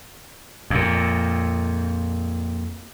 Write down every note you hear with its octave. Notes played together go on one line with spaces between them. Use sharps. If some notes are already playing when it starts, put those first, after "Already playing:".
F2 A#2